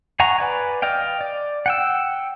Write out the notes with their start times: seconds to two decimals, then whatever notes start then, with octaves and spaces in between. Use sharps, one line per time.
0.20 G#4 F#5 G#5 A#5 C#6
0.38 B4 D5 G#5
0.82 D5 D#5 F5 G5
1.21 D5
1.66 F#5 G5 E6